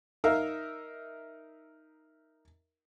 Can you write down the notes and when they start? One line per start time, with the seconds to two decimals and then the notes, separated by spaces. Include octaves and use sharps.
0.24 D#4 A#4 E5 F5